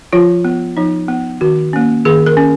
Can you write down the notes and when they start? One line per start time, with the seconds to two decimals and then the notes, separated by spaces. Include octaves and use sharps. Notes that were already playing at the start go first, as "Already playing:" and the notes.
0.13 F3 F4
0.45 B3
0.77 F3 D#4
1.08 B3
1.41 D#3 F#4
1.73 A#3 C#4
2.05 D#3 G#4
2.26 A#4
2.37 C#4